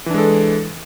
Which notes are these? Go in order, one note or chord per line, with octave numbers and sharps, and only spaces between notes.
E3 G#3 D4 A4